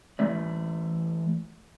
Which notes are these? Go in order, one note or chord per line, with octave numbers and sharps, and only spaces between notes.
E3 A3 D5